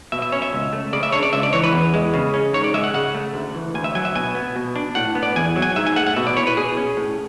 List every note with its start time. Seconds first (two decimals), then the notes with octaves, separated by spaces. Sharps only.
0.12 B2 E5
0.22 E5
0.32 C#4 C#5
0.42 E5
0.53 C#2
0.73 A3
0.93 C#3 D5
1.03 E5
1.13 D4 C#5
1.23 D5
1.33 C#2 E5
1.43 D5
1.53 E3 C#5
1.63 B4
1.73 E2
1.94 G#3
2.14 C#3
2.34 C#4
2.53 G#2 C#5
2.64 D5
2.74 G#3 E5
2.84 F#5
2.94 C#3 F#5
3.15 A3
3.34 D2
3.55 E3
3.74 D2 G#5
3.84 E5
3.95 F#3 G#5
4.05 E5
4.15 B2 G#5
4.35 B3
4.56 B2
4.76 D4
4.95 A2 F#5
5.15 B3
5.23 D5
5.36 E2 G#5
5.56 F#3
5.62 G#5
5.76 G#2 E5
5.86 G#5
5.96 A3 F#5
6.07 F#5
6.16 B2 E5
6.27 D5
6.36 E4 C#5
6.47 B4
6.57 B2 G#4
6.77 C#4
6.97 A2